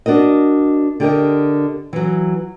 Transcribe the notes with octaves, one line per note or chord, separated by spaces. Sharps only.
D4 F#4 A#4 D#5
D3 G4 A#4 D#5
E3 F#3